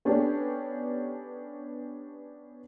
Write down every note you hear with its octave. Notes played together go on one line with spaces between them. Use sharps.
B3 C#4 D4 G4 A4